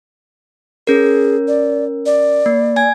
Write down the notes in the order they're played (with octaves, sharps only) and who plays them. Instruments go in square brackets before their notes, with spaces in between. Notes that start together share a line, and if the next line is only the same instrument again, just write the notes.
[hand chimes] C#4 A#4 [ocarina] G#4
[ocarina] D5
D5
[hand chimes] A#3
G#5 G#6